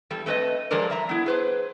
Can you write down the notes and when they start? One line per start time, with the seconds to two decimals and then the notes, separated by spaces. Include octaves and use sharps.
0.10 E2 G3 A4
0.26 A3 C4 B4 C#5 D#5
0.71 F3 F#3 G#3 A4 A#4 D5
0.90 G3 E5 A#5
1.09 B3 E4
1.26 G#4 B4 C5